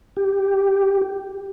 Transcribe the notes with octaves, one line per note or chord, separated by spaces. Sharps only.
G4